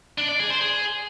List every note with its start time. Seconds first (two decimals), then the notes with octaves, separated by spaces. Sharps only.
0.18 D4
0.29 D5
0.40 G#4
0.50 C5
0.61 G#4